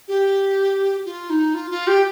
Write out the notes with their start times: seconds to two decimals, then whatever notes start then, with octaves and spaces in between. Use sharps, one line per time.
0.08 G4
1.05 F4
1.30 D#4
1.54 F4
1.70 F4
1.87 G4